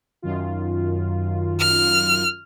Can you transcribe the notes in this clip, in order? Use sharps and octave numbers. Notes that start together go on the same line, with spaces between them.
F#2 D#3 F4
F6